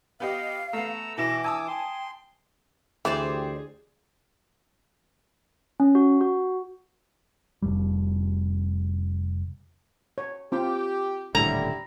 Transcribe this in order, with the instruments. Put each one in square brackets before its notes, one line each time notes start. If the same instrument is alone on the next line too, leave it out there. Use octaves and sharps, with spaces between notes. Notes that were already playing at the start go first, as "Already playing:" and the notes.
[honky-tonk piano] B3 G4 D#5 [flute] F5
[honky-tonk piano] A3 B3 [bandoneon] A#5 E6
[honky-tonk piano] B2 E4 E7 [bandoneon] E3 D6 [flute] A#6
[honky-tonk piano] G#5 A5 D#6 [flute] E6
[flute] G5 [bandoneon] C6
[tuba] D2 [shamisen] E3 [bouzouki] G4 C5 D5 [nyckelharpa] G#4
[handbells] C#4
F#4
F#4
[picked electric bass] F1 G3
[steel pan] C#5
[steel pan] C4 F4 [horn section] G4
[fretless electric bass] D#1 A2 D3 [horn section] G3 E4 [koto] A#5